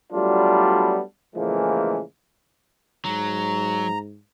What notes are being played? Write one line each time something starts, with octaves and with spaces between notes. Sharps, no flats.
F#3 G3 A3 B3 D4 F4
A2 C#3 E3 F3 G#3 A#3
G#2 F#3 A#5